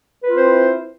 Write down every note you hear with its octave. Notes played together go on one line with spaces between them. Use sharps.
C4 E4 F4 B4 C5